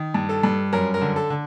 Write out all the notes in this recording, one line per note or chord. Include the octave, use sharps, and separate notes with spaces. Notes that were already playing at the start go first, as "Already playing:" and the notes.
Already playing: D#3
G2
A4
G2
F#2 A#4
A#4
D3
A4
D3